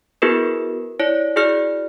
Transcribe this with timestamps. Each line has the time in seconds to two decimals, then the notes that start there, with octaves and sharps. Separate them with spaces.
0.22 B3 E4 F#4 G#4 A#4 B4
0.99 E4 C#5 D5
1.36 E4 F#4 G#4 D5 F6